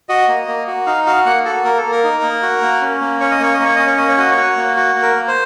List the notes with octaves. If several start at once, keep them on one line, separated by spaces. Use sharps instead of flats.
F#4 D#5
A#3
A#3
F#4
D#4 F5
F#4 F5
A#3 F#5
F#4 A4
A#3 A#4
A4
A#3
A#4
D#4
A#3
F#4
A#3
C#4
A#3
C#4 C#5
D#5
A#3 C#5
D#5
A#3 C#5
C#4 D#5
C#5
A#3 D#5
C#5
F#4 D#5
C#5
F#4
A#3
F#4
A#3
A#4
A#3
C5